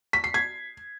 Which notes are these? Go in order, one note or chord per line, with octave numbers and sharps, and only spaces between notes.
B6
C7
G#6